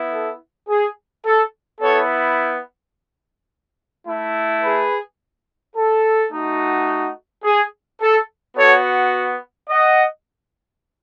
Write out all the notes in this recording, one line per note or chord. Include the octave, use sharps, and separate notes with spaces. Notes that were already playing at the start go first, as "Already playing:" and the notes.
Already playing: B3 E4
A4
G#4
A4
B3 E4 A4 C#5
A3 E4
G#4 B4
A4
A3 D#4 F#4
G#4
A4
B3 F#4 A4 C#5
D#5 F#5